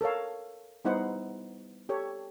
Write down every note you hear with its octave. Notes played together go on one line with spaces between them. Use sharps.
A4 A#4 C#5 F5
G3 B3 D#4 E4 C5 F#5
G4 A4 C#5